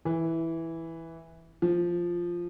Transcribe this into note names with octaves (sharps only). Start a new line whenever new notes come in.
E3
F3